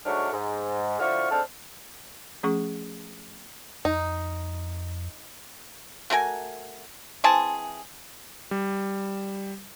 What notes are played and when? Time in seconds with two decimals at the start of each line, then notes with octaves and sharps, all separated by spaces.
0.06 G#2 F#3 A3 D4 C#6 F6
0.33 G#2
1.00 D3 F3 E4 F#4 C#6 F6
1.31 G#2 C4 D4 A4 A5 F6
2.43 F3 A3 C#4 G#4 C#6
3.85 F2 D#4
6.10 A3 F#4 A#4 G#5
7.24 E3 C4 G#4 A5
8.51 G3